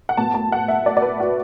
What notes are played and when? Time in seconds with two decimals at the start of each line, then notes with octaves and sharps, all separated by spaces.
0.09 F#5
0.17 A2 F#3 B3 A5
0.34 A5
0.52 F#5
0.68 E5
0.86 D5
0.97 D5
1.02 B4
1.20 F#4